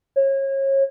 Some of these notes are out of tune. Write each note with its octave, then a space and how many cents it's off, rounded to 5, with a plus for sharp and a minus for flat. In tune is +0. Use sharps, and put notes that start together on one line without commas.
C#5 -30